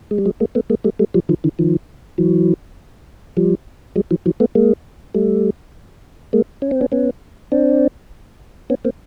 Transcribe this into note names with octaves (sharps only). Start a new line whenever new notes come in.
G#3
G3
F#3 G#3
G#3 A#3
A3 B3
G#3 A#3
G3 A3
G3 A3
F3 G3
D#3 F3
D3 E3
D#3 F3
E3 F#3
F3 G3
F#3 G#3
E3 F#3
E3 F#3
A3 B3
G#3 A#3
G3 A3
G#3 A#3
C#4
C4
B3 C#4
B3 C#4
C4 D4
B3 C#4
A#3 C4